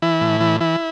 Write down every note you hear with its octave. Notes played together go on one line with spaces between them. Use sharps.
E3 E4
A2
E3
E3 E4